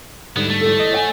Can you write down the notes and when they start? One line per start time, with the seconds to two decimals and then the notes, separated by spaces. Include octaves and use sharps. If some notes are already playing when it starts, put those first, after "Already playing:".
0.36 G#2 D3 G3 B3 E4
0.50 A3
0.61 E2 A4
0.80 D#5
0.92 C#5 F#5 G#5